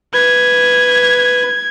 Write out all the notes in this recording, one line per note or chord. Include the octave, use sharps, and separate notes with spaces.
B4 G#6